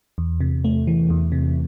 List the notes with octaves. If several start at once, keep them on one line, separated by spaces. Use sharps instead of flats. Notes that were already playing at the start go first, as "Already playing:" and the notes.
E2
C3
A3
E3
E2
C3